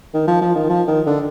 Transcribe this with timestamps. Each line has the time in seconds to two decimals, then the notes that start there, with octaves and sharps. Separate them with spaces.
0.14 D#3
0.27 F3
0.41 F3
0.55 D#3
0.69 F3
0.87 D#3
1.06 D3